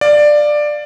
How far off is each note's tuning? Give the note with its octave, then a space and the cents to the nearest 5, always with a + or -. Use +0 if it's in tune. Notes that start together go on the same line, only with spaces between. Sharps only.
D5 +10 F5 +0